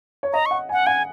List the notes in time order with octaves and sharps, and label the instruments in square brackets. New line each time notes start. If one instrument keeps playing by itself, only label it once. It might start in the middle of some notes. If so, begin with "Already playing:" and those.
[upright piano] C#5
[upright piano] D#5 [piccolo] A#5
[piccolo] C#6
[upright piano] F#5
G#5
[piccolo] F#5
[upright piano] F#5 [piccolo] G#5